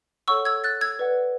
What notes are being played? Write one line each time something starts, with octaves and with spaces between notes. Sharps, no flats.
A4 C#5 F#5 C#6 E6
E6 G#6
F#6 A6
E6 G#6
B4 D5 F#5